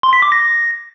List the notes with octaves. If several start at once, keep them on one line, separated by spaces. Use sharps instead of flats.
C6
B6
D6
A#6